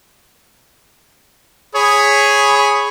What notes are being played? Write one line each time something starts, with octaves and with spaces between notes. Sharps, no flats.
G#4 C#5 B5